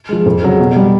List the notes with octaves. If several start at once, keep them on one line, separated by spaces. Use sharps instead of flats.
F3 G#3
F2
C#3 F#3
B2
G3